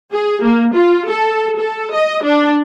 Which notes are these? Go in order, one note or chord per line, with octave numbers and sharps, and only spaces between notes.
G#4
A#3
F4
A4
A4
D#5
D4